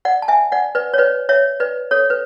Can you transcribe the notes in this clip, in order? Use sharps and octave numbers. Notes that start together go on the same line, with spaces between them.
D5 F#5
A5
E5 G#5
D5 F#5
B4 D5
C#5
B4 D5
C#5 E5
B4 D5
A4 C#5
B4